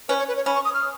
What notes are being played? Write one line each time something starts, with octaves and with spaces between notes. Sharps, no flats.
C#4 B4
C#5
B4
C#5
C#4 B5
C#6
D#6
F6